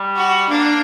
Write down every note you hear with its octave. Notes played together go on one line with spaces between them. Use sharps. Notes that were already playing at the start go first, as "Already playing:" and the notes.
Already playing: G3
F#4
A#3 D4